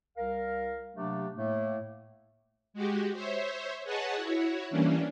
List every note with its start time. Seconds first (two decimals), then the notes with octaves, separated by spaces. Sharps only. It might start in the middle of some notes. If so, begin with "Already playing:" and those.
0.17 C2 A#4 F5
0.96 C3 F#3 A3 A#3 D4 G4
1.36 A2 A3 A#3
2.74 G#3 F#4 G4
3.13 C5 C#5 E5
3.84 G#4 B4 C#5 D#5 F#5 A5
4.16 E4 F#4 C#5
4.70 E3 G3 A#3 C#4 D4